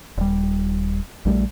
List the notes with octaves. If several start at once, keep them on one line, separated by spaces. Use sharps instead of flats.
D#1 G3
A#1 G3 A3